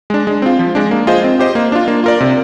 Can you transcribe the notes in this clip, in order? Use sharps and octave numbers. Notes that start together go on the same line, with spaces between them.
G#3 D4
G#3
C4 F4
F3
G#3 D4
A#3
F4 G#4 C5 D#5
C4
G4 C5 D#5
A#3
D4 F4
A#3
F4 A#4 D5
C3